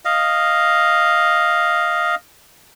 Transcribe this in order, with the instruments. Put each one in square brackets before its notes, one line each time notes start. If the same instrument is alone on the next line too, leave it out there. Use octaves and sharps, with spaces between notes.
[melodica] D#5 F5